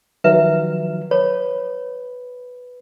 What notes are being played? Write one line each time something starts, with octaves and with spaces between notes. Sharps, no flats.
D#3 F3 F#3 B4 E5
B4 C#5